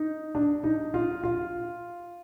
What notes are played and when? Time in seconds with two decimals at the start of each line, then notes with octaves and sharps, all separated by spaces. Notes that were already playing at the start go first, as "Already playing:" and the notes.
Already playing: D#4
0.35 D4
0.64 D#4
0.94 F4
1.24 F4